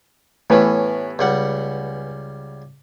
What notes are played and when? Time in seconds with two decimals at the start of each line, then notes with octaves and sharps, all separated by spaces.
0.50 A2 E3 A3 B3 C#4 G4 B4
1.19 C#2 G3 F#5